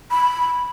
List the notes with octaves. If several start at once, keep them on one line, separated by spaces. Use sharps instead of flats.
B5